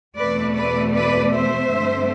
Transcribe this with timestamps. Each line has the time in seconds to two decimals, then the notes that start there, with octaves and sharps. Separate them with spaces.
0.17 E2 B2 A3 C4 B4 D5
0.55 B4 D5
0.93 B4 D5
1.32 C5 E5
1.70 G2 D3 A3 C4